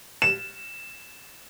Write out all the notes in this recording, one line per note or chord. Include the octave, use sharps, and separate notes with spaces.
E7